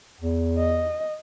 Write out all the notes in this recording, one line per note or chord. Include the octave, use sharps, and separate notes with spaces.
E2
D#5